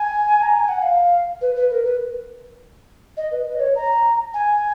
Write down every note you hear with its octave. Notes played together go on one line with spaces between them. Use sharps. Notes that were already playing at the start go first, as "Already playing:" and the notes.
Already playing: G#5
A#5
G#5
F#5
F5
B4
B4
A#4
B4
D#5
B4
B4
D#5
C#5
A#5
G#5